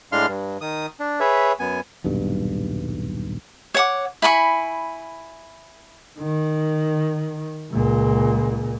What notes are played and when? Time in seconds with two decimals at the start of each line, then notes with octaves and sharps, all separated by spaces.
0.12 A2 G#3 D4 F5 C6 F6
0.28 G2
0.61 D#3 D#6
1.00 D4
1.20 G#4 B4 C#5 E5
1.59 F#2 B3 G#5
2.04 D#1 B1 G2
3.74 C#5 F#5 D6
4.22 E4 G#5 B5 C#6
6.19 D#3
7.72 C#2 A#2